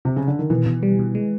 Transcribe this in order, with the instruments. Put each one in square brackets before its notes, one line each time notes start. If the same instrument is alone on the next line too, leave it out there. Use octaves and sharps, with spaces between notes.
[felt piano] C3
C#3
D3
D#3
[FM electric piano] B2 [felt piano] E3
[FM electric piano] B2
G3
B2
G#3